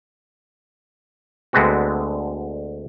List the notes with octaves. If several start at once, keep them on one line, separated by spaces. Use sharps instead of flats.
D2 D3 G#3 B3 C4 F#4